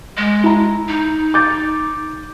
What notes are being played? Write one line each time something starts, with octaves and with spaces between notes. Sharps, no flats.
G#3
E4 A#5
D#4
D6 G6 A6